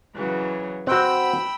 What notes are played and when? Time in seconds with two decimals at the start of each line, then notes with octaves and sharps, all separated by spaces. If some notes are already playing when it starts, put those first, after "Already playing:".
0.15 C#3 E3 F#3
0.87 C4 F#4 G5 B5 E6